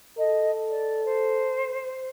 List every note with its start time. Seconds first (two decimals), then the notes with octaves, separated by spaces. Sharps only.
0.18 A4 D#5
0.70 D5
1.05 C5